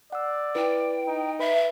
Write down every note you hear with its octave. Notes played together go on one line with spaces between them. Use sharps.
D5 F#5 E6
E4 B4 G5
D#4
B4 E5 B5